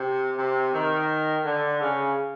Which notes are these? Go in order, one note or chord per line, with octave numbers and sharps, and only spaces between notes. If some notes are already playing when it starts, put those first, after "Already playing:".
Already playing: C3
C3
D#3
D3
C#3